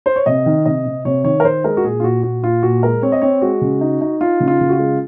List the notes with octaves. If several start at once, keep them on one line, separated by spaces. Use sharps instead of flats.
C5
C#5
C3 D#5
D#3
C3 D#5
C3
C3 C#5
D#3 C#5
A#4
D#3 C5
G#3 A#4
F#4
A#2 G#4
F4
A#2 F#4
A#2 F#4
A#2 F4
A#2 F#4
G#3 A#4
C4 C#5
D#5
C4 C#5
G#3 F#4
C#3
D#4
D#4
D#4 F4
C#3
F4
C#3
F#4
F4
G#3